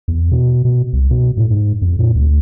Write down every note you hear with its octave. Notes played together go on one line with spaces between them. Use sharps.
E2
B2
B2
C2
B2
A2
G#2
F2
A#2
D2